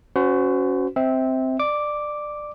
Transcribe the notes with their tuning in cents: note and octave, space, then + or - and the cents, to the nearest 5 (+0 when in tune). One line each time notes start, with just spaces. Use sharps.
C#4 +0 F#4 +0 C5 -45
C4 +0 E5 -20
D5 +20 D6 +0